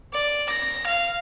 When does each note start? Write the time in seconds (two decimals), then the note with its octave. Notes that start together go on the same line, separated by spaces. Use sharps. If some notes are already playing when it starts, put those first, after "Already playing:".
0.13 D5
0.49 A#6
0.87 F5